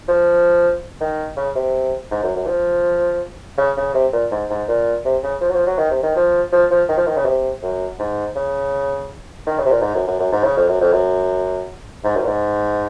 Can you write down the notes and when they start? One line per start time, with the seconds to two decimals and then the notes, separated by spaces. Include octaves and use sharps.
0.08 F3
1.01 D#3
1.37 C#3
1.55 C3
2.11 G#2
2.23 F#2
2.36 F#2
2.47 F3
3.58 C#3
3.77 C#3
3.94 C3
4.13 A#2
4.31 G#2
4.50 G#2
4.68 A#2
5.05 C3
5.23 C#3
5.41 F3
5.49 F#3
5.54 F3
5.67 F#3
5.78 D#3
5.91 C3
6.03 D#3
6.16 F3
6.52 F3
6.71 F3
6.89 D#3
6.97 F3
7.07 D#3
7.16 C#3
7.25 C3
7.63 F#2
7.99 G#2
8.36 C#3
9.47 D#3
9.58 C#3
9.65 C3
9.71 A#2
9.82 G#2
9.95 F#2
10.07 F#2
10.19 F#2
10.32 G#2
10.44 C#3
10.57 F2
10.68 F#2
10.81 F2
10.93 F#2
12.04 G#2
12.16 F#2
12.24 A#2
12.28 G#2